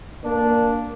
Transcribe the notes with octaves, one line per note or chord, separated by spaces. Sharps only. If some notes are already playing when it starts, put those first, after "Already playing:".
A#3 D4